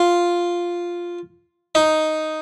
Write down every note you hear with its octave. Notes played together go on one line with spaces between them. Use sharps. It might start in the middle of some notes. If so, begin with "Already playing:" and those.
Already playing: F4
D#4